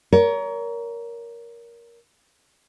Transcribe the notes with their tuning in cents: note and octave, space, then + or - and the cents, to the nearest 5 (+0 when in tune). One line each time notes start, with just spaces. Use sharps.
A#4 +10 C#5 +35